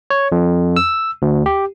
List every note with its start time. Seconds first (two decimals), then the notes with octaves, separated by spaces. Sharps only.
0.10 C#5
0.32 F2
0.76 E6
1.22 D2
1.46 G4